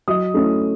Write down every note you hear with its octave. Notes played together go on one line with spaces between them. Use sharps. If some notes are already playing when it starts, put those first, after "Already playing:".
F#3 D#5 D#6
A3 C#4 E4